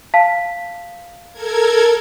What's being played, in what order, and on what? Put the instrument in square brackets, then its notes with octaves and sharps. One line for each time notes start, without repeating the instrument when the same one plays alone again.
[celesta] F5 A5 B6
[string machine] A4 A#4 G#6